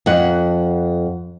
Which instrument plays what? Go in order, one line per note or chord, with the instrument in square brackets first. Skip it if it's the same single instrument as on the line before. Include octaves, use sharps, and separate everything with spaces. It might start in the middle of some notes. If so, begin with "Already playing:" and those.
[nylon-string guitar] F2 F#5